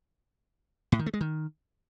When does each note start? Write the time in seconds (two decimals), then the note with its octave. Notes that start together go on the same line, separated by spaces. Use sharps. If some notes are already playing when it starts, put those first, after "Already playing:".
0.92 A2
0.99 D#3
1.06 A3
1.14 G#3
1.21 D#3